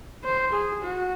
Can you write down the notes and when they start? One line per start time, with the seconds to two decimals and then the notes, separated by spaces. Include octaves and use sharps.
0.24 C5
0.53 G#4
0.83 F#4